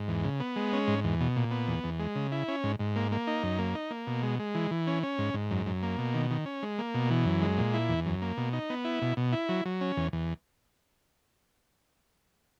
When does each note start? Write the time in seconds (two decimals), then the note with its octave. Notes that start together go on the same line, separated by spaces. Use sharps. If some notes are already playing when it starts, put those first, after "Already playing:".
Already playing: G#2
0.08 E2
0.24 C#3
0.40 B3
0.56 G#3
0.73 C#4
0.88 G#2
1.04 E2
1.21 B2
1.36 A#2
1.51 B3
1.68 E2
1.84 E2
1.99 G#3
2.15 C#3
2.32 E4
2.48 C#4
2.64 G#2
2.79 G#2
2.96 A#3
3.12 A#3
3.27 D#4
3.43 F#2
3.59 A#3
3.75 D#4
3.91 A#3
4.07 B2
4.23 G#3
4.39 G#3
4.55 E3
4.71 E3
4.87 C#4
5.03 C#4
5.18 G#2
5.34 G#2
5.51 F#2
5.66 F#2
5.83 A#3
5.98 B2
6.14 D#3
6.30 D#3
6.46 C#4
6.63 G#3
6.79 A#3
6.94 B2
7.10 E3
7.26 F#2
7.42 G#3
7.58 A#2
7.74 E4
7.89 E2
8.05 F#2
8.22 A#3
8.37 B2
8.53 D#4
8.70 B3
8.85 E4
9.02 B2
9.17 B2
9.32 E4
9.49 F#3
9.65 F#3
9.81 C#4
9.97 E2
10.13 E2